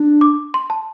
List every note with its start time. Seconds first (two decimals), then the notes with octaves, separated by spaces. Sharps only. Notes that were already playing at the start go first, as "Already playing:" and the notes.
Already playing: D4
0.21 D6
0.54 C6
0.70 A5